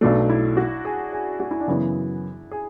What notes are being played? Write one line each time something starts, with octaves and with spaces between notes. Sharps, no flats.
B1 B2 F#3 A3 D4
E4
F#4
G#4
G#4
F#4
E4
D4
F#2 C#3 E3 B3 E4
G#4